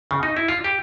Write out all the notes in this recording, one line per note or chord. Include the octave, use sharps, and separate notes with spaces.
C#3
D#4
E4
F4
G4